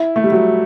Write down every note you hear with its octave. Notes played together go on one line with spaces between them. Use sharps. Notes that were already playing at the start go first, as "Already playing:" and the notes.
Already playing: E4
A3
G3
F#3